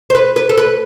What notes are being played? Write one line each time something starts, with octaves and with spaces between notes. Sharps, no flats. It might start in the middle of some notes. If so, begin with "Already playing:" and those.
C5
B4
B4
A4
B4